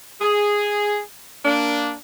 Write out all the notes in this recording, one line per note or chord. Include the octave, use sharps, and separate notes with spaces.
G#4
A#3 D4